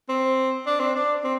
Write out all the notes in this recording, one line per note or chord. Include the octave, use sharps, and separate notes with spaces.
C4
D4
C4
D4
C4